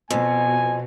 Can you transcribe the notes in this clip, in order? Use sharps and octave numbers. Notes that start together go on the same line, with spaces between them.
F2 B2 G#5